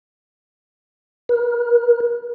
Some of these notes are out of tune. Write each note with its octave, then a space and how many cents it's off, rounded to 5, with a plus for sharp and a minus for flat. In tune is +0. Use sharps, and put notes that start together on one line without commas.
A#4 +40